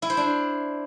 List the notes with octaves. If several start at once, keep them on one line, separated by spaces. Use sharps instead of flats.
E4
C5
D4